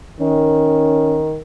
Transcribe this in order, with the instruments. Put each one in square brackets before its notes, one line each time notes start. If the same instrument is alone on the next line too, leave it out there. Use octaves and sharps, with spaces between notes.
[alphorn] D#3 [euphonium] C#4